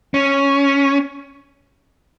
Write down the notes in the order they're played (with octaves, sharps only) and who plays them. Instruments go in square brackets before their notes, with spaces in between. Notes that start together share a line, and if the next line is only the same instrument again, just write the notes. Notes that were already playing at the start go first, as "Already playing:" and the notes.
[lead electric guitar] C#4